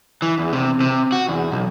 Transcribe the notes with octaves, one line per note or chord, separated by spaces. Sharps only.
E3
E2
C3
C3
F#4
E2
B1